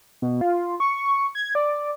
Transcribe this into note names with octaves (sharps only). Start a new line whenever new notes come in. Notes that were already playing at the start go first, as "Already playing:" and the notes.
B2
F4
C#6
G#6
D5